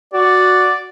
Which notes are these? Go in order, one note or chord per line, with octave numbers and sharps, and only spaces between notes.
F#4 D5